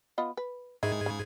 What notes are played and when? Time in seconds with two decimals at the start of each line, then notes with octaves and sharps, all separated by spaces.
0.18 B3 F4 D#5
0.37 B4
0.83 G#2 D#3 E4 G#4 G#6
1.06 C#3